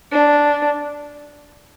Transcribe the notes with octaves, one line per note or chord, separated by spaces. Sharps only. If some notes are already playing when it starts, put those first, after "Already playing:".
D4